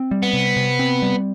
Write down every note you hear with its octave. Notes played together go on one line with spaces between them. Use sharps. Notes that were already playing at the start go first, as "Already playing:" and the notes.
Already playing: C4
G3
B3
C3
C3
C4
G3